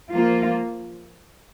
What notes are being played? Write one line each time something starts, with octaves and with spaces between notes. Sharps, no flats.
F3 A#3 F4